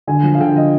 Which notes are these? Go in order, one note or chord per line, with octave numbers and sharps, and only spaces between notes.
D3 G#5
F3
F5
D3 G5
F5
F3 D#5